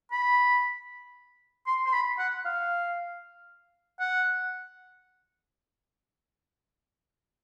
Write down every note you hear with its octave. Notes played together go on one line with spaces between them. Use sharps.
B5
C6
C6
B5
F#5
F5
F#5